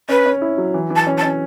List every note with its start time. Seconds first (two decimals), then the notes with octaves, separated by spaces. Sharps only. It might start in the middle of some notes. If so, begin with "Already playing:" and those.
0.09 C#4 B4
0.26 C#4
0.41 E4
0.58 F#3
0.74 E3
0.90 E3
0.95 A5
1.06 C#4
1.17 A5
1.23 C#4